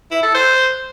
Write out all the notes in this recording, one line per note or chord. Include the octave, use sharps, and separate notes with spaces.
E4
A4
C5